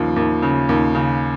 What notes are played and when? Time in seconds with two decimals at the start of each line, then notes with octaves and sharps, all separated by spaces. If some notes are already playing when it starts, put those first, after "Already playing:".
Already playing: D#2 C#3 F3
0.16 D#2
0.42 C#3
0.69 D#2
0.95 C#3